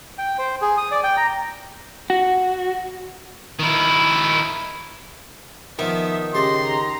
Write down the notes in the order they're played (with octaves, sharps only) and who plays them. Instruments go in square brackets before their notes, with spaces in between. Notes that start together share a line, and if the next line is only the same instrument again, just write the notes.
[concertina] G5
C5
G#4
D#6
D5
G5
A#5
[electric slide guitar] F#4
[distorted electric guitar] D#3 E4
[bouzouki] D#3 [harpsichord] F3 B3 [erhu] E5
[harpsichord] C#3 G4 A5 [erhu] D#5 [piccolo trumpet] C6
[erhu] A#5